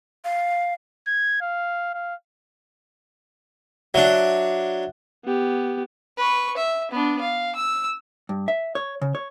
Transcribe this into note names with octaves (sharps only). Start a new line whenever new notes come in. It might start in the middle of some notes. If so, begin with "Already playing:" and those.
F5
G#6
F5
F5
F#3 D4 E5 F#5
B3 G4
B4 C#6
E5
B3 D4
F5
E6
G2
E5
C#5
C#3
C#5